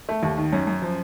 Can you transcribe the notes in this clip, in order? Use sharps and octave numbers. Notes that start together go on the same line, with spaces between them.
A3
D#2
D#3
F#2 C#4
F#2
F3